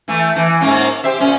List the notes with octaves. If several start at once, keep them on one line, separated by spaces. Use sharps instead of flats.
E3 A3
E3
G#2 A#3 C#4
G4 C5 E5
A#2 C#4